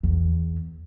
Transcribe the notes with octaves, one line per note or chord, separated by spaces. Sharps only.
E2